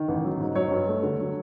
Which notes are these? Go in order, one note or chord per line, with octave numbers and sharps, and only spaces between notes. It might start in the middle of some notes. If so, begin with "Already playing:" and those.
Already playing: D#3
A1
F#3
G#2
F#3 C#5
G2
A3
D3
F#3